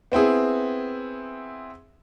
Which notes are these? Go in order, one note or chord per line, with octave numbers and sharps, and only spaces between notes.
B3 C4 E4 G#4